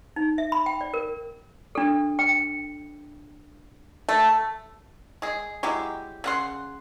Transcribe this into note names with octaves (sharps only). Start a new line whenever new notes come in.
D#4
E5
B5
G5
D5
A#4
D4 A4
G5
A3
G#3 G#4
F#3 G#3 E4 G4
C#3 F#5 C6